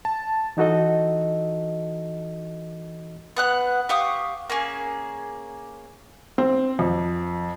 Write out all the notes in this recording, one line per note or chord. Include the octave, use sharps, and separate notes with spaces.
A5
E3 D#4 F#4 A4 D#5
B3 F#5 F#6
G4 F5 C#6 D#6
A#3 C#4 G#4
C4
F2